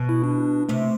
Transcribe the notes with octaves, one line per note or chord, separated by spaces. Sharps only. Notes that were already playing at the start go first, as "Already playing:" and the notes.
Already playing: B2
E4
D4
C3 A3